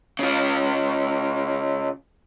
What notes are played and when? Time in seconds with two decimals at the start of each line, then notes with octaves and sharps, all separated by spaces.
0.19 C#3 F4